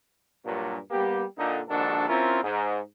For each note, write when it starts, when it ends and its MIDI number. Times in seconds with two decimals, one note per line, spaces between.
0.45 0.79 43
0.45 0.79 46
0.45 0.79 54
0.91 1.24 55
0.91 1.24 58
0.91 1.24 59
0.91 1.24 67
1.38 1.60 46
1.38 1.60 50
1.38 1.60 63
1.69 2.08 34
1.69 2.08 44
1.69 2.08 51
1.69 2.08 62
1.69 2.08 66
1.69 2.08 69
2.09 2.41 60
2.09 2.41 61
2.09 2.41 64
2.09 2.41 65
2.09 2.41 70
2.43 2.80 44